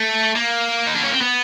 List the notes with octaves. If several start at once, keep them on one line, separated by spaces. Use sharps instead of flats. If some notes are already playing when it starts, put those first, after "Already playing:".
Already playing: A3
A#3
D#4
D4
C#4
C4
B3